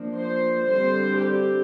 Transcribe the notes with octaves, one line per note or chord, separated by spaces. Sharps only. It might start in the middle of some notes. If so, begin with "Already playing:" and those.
Already playing: F3 A#3 D4
C5
D3 G3 C4 C5
G4